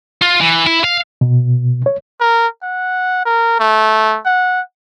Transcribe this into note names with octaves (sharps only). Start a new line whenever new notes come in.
F4
E3
E4
F5
B2
C#5
A#4
F#5
A#4
A3
F#5